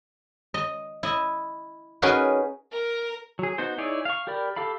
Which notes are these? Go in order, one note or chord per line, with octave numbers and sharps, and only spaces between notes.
D#5
E4 D#5
C#4 D#4 F#4 G#4 A#4 B4
A#4
F#3 G#4
B3 D#4 F#4 C5
D#4 E4 G#4 C#5 D5
F5 C#6
G4 A#4 D5 B5
G4 A4 F5 B5